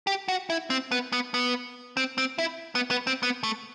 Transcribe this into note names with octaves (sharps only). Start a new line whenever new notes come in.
G4
F#4
E4
C4
B3
B3
B3
C4
C4
E4
B3
B3
C4
B3
A3